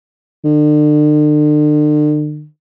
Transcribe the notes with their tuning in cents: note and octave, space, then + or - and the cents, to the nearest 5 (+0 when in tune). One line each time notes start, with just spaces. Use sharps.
D3 +40